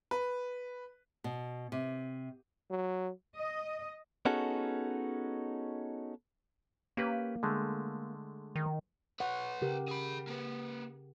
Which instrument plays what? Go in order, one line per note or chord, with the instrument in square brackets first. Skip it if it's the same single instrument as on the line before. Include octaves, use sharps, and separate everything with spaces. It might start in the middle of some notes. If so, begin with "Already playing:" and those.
[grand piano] B4
[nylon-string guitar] B2
C3
[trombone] F#3
[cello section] D#5
[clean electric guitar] B3 C#4 D#4 F#4 G#4 A4
[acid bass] A#3 [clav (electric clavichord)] C#4 G4 B4
[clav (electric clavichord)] D3 G#3 A3
[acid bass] D#3
[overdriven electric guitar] B4 C#5 [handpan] F#5
[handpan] C#3 G4 A#4
[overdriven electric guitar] G#4 B5
A#3 B4